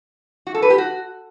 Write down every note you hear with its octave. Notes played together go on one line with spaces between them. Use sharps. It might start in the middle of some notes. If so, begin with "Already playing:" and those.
F#4
A4
B4
G4
F#4